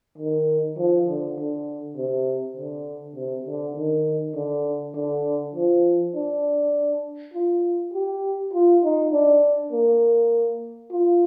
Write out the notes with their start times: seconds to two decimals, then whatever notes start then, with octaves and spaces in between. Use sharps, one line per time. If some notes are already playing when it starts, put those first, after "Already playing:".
0.18 D#3
0.78 F3
1.08 D3
1.38 D3
1.97 C3
2.57 D3
3.16 C3
3.46 D3
3.77 D#3
4.36 D3
4.95 D3
5.55 F3
6.15 D4
7.34 F4
7.94 G4
8.54 F4
8.83 D#4
9.13 D4
9.72 A#3
10.91 F4